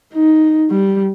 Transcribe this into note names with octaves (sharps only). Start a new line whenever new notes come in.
D#4
G3